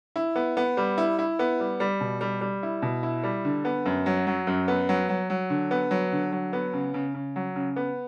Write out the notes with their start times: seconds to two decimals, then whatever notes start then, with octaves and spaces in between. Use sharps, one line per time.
0.16 E4
0.35 B3
0.57 B3
0.77 G3
0.98 E4
1.19 E4
1.39 B3
1.60 G3
1.80 G3
2.00 B2
2.21 G3
2.41 G3
2.63 E4
2.82 B2
3.03 E4
3.23 G3
3.45 D3
3.65 B3
3.85 F#2
4.06 F#3
4.27 F#3
4.47 F#2
4.68 B3
4.89 F#3
5.09 F#3
5.30 F#3
5.50 D3
5.71 B3
5.91 F#3
6.12 D3
6.32 F#3
6.53 B3
6.73 C#3
6.94 C#3
7.14 C#3
7.36 F#3
7.56 C#3
7.76 B3